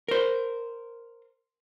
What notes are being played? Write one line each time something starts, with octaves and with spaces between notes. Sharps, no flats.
A#4 C5